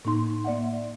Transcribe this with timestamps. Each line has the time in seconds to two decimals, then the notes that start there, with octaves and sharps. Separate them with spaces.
0.05 A2 A#3 D#4 C6
0.44 A#3 D5 E5 F#5